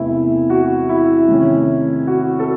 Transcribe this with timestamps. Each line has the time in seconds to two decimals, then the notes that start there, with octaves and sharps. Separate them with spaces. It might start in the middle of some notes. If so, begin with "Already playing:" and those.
Already playing: E2 C3 E3 A3 E4
0.50 F#4
0.89 E4
1.28 C3 D#3 A3 C#4
2.07 F#4
2.39 A4